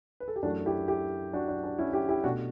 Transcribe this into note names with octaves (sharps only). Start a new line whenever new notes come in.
B4
A4
G4
F#2 E3 A3 D4 F#4
E4 G4
E4 G4
D4 F#4
D4
D4
C#4 E4
E4 G4
E4 G4
B2 A3 D4 F#4